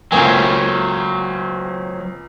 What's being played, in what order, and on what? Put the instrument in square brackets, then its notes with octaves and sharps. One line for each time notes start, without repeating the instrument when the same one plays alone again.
[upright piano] C#2 A#3 G#5 [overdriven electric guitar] F#3 C4